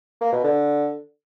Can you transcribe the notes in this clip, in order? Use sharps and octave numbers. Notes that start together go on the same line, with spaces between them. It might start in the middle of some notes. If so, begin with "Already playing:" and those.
A#3
B2
D3